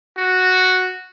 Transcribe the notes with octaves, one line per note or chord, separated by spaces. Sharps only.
F#4